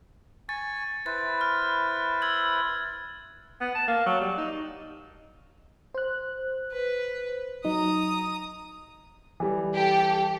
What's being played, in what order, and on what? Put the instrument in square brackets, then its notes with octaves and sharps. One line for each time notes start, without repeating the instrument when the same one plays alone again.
[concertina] G#5 C#6 [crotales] A6
[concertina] E4 B4 C5 [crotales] A6
[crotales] F6
E6 G#6 F#7
[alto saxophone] B3
A5
A#3
F#3
G3
D#4
[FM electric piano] C5 F#6
[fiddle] B4
[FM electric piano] F#3 D#4 [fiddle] A#5 D#6
[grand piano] E3 G3
[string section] G4 A4